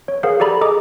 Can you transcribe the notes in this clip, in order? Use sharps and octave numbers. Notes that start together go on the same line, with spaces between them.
C#5
G#4 A#4 C5 F5 F#5
G4 A4 D5 A#5 B5
G#4 A4 D#5 A#5 D6